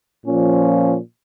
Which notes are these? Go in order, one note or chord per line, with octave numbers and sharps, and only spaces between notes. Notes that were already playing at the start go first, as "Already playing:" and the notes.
A#2 F3 C#4